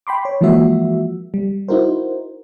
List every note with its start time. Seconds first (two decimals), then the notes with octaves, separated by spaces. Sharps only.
0.07 G5 B5 C6 D6
0.25 C#5
0.41 E3 F3 G#3 A#3 F#4 E5
1.34 G3
1.68 D#4 E4 F#4 A#4 C5